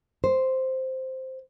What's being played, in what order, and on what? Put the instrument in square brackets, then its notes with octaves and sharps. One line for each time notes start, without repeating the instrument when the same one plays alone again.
[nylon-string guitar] C5